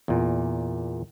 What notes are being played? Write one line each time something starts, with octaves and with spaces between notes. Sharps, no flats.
E2 A#2